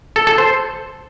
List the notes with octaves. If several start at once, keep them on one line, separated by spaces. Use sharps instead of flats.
A4
A4
C5